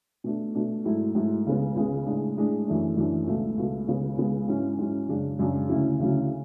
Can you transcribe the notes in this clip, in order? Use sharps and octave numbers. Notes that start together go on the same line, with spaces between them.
B2 A3 D4
B2 A3 D4
G#2 F#3 A3 E4
G#2 F#3 A3 E4
C#2 C#3 G#3 B3
C#2 C#3 G#3 B3
A2 G#3 D4
A2 G#3 D4
F#2 E3 A3 D4
F#2 E3 A3 D4
C#2 B2 A3
C#2 B2 A3
C#2 C#3 G#3 B3
C#2 C#3 G#3 B3
G#2 F#3 C#4 E4
G#2 F#3 C#4 E4
F#2 C#3 G#3 D4
F#2 C#3 G#3 D4
D2 C#3 F#3 C#4 E4
D2 C#3 F#3 C#4 E4